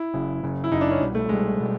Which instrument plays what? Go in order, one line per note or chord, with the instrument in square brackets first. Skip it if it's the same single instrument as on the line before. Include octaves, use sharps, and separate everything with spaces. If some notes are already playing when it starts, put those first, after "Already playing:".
Already playing: [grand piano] E4
[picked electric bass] F#1 F#2 C#3
F#1 F#2 C#3
[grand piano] E4
[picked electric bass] F#1 F#2 C#3 [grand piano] D#4
[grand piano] D4
C#4
[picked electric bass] C2 B2 G3
[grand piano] A3
[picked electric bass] C2 B2 G3 [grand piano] G#3
[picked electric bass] B2 G3